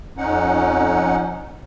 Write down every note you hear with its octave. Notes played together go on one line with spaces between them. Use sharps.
F2 C#4 D#4 F#5